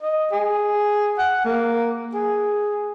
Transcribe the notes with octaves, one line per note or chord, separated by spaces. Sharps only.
D#5
G#4
F#5
A#3
G#4